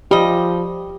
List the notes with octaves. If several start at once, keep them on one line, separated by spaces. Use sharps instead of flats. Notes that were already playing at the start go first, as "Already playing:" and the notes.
F3 G3 G4 D#5